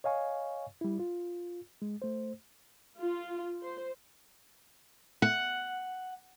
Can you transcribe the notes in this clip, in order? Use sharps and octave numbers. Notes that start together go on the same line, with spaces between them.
C#5 D#5 F5 G#5 C#6
G3 E4
F4
G#3
A3 C5
F4
C5
F#5